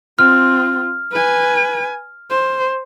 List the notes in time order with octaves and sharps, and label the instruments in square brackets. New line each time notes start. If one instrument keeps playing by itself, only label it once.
[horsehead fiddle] C4 F4 [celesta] F6
[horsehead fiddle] B4 G#5
C5